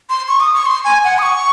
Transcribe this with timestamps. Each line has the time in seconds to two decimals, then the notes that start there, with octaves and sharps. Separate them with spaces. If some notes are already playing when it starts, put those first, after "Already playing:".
0.10 C6
0.28 C#6
0.40 D#6
0.54 C#6
0.66 C6
0.85 G#5
1.04 F#5
1.18 D#6
1.23 C#6